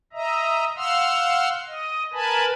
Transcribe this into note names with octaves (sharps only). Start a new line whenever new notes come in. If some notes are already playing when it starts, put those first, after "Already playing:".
D#5 E5 A#5
F5 F#5 C6 E6 F6
D#5
A#4 B4 G#5 A5 B5